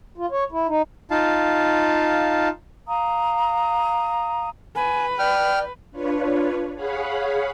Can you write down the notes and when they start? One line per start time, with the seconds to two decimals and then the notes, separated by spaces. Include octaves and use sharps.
0.18 F4
0.31 C#5
0.52 E4
0.68 D#4
1.11 D#4 F4 F5 A5
2.87 F5 A#5 D#6
4.76 B4 G#5
5.19 D5 G5 F6
5.91 D4 F4 B4 C#5
6.76 G#4 C#5 F5 F#5 B5